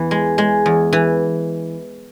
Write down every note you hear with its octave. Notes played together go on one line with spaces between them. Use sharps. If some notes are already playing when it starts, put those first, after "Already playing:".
Already playing: E2 E3
G#3
G#3
E2
E3